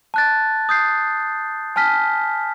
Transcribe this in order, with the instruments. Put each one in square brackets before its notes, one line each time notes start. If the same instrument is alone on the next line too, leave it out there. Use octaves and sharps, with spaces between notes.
[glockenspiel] A5 F#6 A6
D#6 G6 C7
G#5 A5 F6 B6